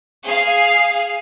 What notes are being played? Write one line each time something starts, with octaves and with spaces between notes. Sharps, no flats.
G#4 F5